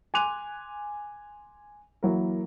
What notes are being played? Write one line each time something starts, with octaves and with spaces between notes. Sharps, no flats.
G#5 C6 D6 F#6 D#7 F7
E3 F#3 A#3 E4 A#4